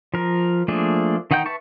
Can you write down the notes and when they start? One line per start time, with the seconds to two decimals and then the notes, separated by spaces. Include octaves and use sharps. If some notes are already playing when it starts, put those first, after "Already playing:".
0.14 F3 A#4
0.68 F3 A3 A#3 D4 G#4
1.31 D#3 D#4 F#5 G5 G6
1.46 B4 E5 A5 C#6